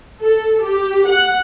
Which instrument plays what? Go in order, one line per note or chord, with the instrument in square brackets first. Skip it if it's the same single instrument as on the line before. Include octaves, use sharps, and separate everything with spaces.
[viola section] A4
G4
F#5